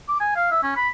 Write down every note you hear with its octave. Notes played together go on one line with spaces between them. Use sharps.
D6
G#5
F5
E5
C#4
B5